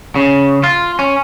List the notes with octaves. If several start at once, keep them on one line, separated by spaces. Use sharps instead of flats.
C#3
F4
C#4